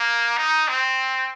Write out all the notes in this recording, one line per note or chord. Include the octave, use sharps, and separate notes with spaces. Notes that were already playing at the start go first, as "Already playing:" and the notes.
Already playing: A#3
D#4
C4